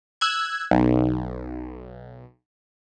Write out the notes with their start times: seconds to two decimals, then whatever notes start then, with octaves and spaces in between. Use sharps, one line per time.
0.21 E6 F#6 G#6
0.71 B1